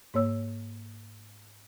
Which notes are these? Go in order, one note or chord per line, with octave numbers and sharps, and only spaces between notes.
G#2 A#3 C#5 E6